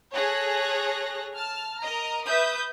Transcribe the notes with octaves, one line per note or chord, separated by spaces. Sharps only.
G#4 A4 C#5 F#6 A#6
A5 F6
A#4 D#5 A#5
B4 E5 D#6 G6